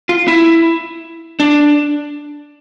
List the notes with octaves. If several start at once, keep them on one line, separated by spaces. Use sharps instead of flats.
F4
E4
D4